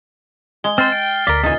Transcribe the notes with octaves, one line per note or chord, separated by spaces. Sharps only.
G#3 G7
C4 C5 F6 A6 C7
G5
D2 A#4 D5 F5 B6
A#2 C#3 E3 D#4 G#5